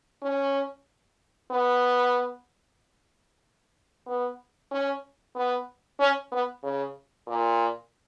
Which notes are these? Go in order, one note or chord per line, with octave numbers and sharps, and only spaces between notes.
C#4
B3
B3
C#4
B3
C#4
B3
C#3
A#2